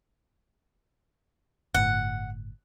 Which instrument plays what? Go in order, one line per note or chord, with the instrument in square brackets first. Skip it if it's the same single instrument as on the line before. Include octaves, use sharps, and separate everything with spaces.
[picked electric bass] G1 A2 [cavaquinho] F#5